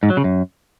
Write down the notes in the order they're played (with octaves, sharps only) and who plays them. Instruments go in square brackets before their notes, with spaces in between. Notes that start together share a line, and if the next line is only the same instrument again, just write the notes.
[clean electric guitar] G#2
F#3
C#3
F#2